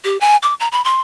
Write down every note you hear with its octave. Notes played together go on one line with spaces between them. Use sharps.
G4
G#5
D6
A#5
B5
C6